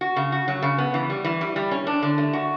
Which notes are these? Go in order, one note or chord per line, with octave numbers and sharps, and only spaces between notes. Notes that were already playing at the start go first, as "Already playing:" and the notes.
F#4
C#3
F#4
F#3
C#3
B3
E3
G3
E3
G3
G3
C#4
D4
D3
A3
F#4